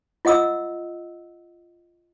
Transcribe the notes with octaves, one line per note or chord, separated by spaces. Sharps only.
F4 D#5 F#5 D#6 E6